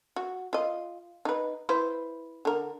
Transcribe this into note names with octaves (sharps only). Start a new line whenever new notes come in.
F#4
F4 D#5
D#4 B4
E4 B4 C5
D3 A#4